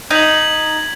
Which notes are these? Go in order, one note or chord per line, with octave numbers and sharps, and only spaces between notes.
D#4 G#6 B6 F#7